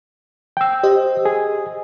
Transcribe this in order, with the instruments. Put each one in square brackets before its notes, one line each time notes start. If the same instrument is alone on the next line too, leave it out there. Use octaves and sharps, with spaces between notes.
[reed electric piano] G5 E6
[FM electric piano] G4 C5 D#5
[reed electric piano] G#4